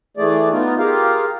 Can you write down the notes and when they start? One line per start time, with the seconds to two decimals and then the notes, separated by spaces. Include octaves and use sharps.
0.17 E3 A3 G#4 D5
0.51 B3 D#4 F4
0.78 F4 G4 G#4 A#4 F5